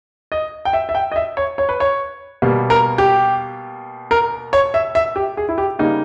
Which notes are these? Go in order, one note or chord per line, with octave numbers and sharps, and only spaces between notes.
D#5
G5
E5
E5
G5
D#5
E5
C#5
C#5
B4
C#5
B2 G3 A#3
A#4
G4
A#4
C#5
E5
E5
G4
G#4
E4
G4
C#3 G3 A#3 D#4